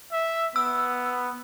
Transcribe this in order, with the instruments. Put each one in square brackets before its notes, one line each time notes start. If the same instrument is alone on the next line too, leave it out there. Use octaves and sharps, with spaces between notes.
[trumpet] E5
[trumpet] B3 [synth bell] E6